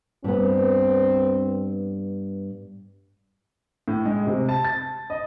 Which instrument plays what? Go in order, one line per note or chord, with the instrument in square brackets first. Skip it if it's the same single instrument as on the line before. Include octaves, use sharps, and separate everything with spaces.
[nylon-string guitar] G2 B3 [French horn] C4
[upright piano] A2
G#3
C3
A5
A6
D#5